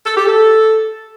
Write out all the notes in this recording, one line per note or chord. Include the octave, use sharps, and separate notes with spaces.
A4
G4
A4